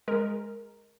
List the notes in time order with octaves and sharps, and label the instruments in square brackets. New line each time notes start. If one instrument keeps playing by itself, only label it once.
[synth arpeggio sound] G#3 A#4